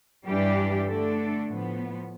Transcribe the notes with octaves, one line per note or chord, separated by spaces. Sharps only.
G2 E3 G3 D4 G4
D3 A3 D4 A4
A2 F3 B3